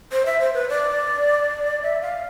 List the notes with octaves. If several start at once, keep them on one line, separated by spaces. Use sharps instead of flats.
C5
E5
C5
B4
D5
E5
F5